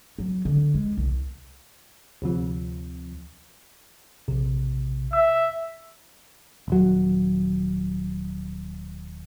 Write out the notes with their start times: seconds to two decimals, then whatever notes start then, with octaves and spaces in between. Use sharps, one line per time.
0.19 F#3
0.45 D3
0.74 G#3
0.97 C2
2.22 D2 C3 F3
4.28 A#1 C3
5.13 E5 E6
6.68 D#1 F#3